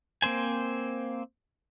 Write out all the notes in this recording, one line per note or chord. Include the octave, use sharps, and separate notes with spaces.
A#3 C4 C5 G#5